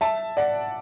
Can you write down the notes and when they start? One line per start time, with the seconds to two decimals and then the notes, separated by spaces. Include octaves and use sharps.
0.01 E5 A5
0.37 D5 F#5